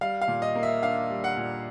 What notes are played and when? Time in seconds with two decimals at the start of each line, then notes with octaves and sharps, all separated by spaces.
0.01 G3 F5
0.21 F5
0.28 A#2
0.42 D#5
0.56 A#3
0.63 E5
0.83 D4 F5
1.10 G3
1.24 F#5
1.37 A#2